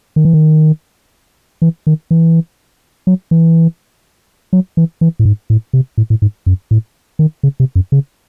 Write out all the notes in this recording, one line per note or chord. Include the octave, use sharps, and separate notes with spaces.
D#3
E3
D#3
E3
D#3
E3
F#3
E3
F#3
E3
E3
A2
G#2
A2
C3
A2
A2
G#2
F#2
A2
D#3
C#3
C3
F#2
C#3